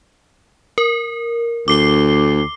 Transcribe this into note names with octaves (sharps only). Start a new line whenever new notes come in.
A#4
D2 D6 C7 G7